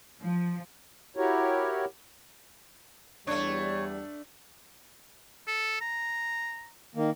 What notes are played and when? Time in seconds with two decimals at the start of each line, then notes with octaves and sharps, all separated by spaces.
0.22 F3
1.17 E4 F#4 G4 A#4 C#5
3.27 E2 G3 A3 D4 C#5
5.47 A4
5.81 A#5
6.95 D#3 A#3